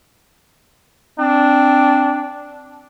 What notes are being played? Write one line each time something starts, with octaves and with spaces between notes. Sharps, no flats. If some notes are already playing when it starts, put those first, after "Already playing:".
C4 D4